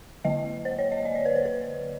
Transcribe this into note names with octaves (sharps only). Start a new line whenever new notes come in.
D3 F#3 A#3 D#5
C5
C#5
D#5
D5
C#5
B4
C5
B4